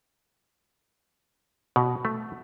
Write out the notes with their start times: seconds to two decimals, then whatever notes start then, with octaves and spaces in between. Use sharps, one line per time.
1.76 B2
2.05 A3